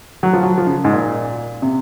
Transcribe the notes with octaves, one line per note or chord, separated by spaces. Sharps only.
F#3
F3
F#3
F3
C#3
G#2
A#2
C3